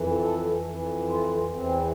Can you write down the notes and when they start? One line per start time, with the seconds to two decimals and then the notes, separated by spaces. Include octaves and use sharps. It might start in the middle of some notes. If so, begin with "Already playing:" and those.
Already playing: F2 E3
0.22 A4
0.65 F2 E3
1.08 F4
1.52 E2 E3 C4